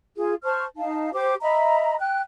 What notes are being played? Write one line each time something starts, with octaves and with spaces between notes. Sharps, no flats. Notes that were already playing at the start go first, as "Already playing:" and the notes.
F4 G#4
C5 A5 C#6 F6
D#4 F5 A5
G4 C5 D6
D#5 E5 A#5 B5
G5 F#6